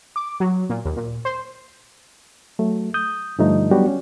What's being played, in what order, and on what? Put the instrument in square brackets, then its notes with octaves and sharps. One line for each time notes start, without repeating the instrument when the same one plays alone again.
[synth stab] D6
F#3
A#2
D#2
A#2
C5
[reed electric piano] F#3 A3
D#6 G6
G2 D3 F3 G3 A3 D#4
F#3 G3 B3 D4 F#4 G4
C#4